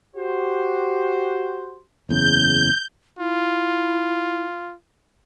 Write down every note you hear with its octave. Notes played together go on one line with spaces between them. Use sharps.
F#4 G4 C5
F#1 E2 C#3 G6
E4 F4